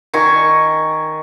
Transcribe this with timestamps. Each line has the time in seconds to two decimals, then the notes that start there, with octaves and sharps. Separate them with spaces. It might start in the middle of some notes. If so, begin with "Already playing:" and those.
0.14 D#3 G#5 C#6